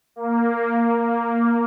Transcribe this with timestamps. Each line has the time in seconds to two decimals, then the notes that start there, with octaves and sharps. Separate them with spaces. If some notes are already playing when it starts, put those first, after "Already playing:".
0.16 A#3
0.82 A#3